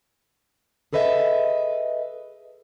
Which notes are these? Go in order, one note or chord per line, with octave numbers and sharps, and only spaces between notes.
G#4 A4 B4 D#5 E5